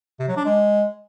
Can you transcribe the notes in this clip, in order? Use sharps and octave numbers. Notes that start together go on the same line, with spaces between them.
C3
F#3
D4
G#3